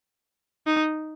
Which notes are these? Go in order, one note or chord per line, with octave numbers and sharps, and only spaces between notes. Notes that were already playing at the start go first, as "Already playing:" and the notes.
D#4